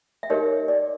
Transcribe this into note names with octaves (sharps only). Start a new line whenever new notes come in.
E5
D#4 G4 A#4 C#5 D#5
D5